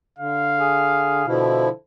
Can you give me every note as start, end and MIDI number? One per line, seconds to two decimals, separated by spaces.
0.19 1.23 50
0.19 1.34 77
0.58 1.25 68
1.27 1.68 47
1.27 1.69 50
1.27 1.69 53
1.27 1.69 64